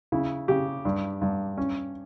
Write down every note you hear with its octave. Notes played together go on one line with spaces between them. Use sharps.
C#3 E4
C#3 G4
G2
G2
C#4